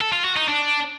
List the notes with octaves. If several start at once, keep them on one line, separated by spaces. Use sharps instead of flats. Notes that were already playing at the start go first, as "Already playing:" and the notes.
A4
F4
F#4
D#4
D4